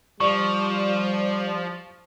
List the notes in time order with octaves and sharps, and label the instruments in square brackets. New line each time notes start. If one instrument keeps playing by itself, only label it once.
[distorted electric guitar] F3 [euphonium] G3 [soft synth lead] D5 [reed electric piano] C#6